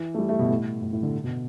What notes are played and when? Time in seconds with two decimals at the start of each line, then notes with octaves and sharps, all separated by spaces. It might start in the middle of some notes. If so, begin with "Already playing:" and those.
Already playing: E3
0.15 A3
0.18 G3
0.29 A3
0.39 B2
0.50 A2
0.82 A2
0.93 A2
1.03 D3
1.24 B2